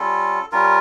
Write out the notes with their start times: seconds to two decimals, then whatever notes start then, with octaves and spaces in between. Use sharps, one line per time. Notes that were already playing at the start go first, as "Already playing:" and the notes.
Already playing: G3 C#4 F4 A4
0.52 G3 C#4 F4 A#4